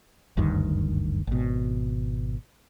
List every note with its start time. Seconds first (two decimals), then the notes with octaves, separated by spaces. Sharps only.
0.37 F#1 D2 G2 D#3
1.27 G#1 B2